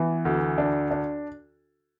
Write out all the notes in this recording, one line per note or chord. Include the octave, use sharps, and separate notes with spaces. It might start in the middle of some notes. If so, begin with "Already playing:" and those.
Already playing: E3 B3
D2
D4
D4